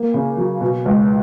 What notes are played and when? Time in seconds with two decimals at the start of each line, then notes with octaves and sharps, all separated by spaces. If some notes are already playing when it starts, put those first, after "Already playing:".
Already playing: A#3
0.14 C#3
0.37 F#3
0.61 B2
0.86 C#2